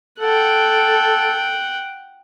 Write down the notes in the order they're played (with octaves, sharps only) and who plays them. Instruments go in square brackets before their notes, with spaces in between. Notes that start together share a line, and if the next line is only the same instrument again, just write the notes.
[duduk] A4 [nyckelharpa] F#5 G5